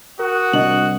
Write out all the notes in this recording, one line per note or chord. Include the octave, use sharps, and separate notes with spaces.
F#4 A#4 F#5 D#6
C2 D4 D#5 F#7